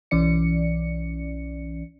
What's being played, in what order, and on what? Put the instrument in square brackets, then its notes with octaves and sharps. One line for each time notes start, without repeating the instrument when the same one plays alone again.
[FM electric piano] B1 E3 C#4 D5 C#7